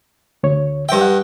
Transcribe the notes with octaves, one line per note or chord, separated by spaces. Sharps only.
D2 C#5
G2 E5 G5
F#5